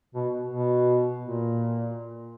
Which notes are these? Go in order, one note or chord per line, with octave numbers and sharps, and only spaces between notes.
B2
B2
A#2